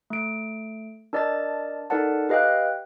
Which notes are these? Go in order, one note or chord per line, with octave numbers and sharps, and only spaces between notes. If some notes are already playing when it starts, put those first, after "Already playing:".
A3 D7
D4 A#4 D5 D#5 A5 A6
D#4 A4 A#4 D5 F#5 A5
G4 B4 D#5 F5 G5 F#6